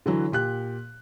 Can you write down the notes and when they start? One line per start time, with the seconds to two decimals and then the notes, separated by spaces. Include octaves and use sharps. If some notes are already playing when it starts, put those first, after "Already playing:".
0.06 D3 E3 F#3
0.32 A#2 G4 F#6